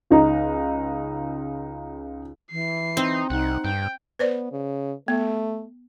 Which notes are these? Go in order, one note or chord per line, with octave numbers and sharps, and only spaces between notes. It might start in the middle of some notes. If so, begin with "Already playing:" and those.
C#2 D#4 A#5
E3 C7
C4 D#4
C2 D#4 F#5
G2 G5
B3 B4 C5 D5
C#3
A3 B3